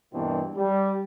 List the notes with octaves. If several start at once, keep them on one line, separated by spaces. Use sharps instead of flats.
G2 B2 E3 A#3 C4 D4
G3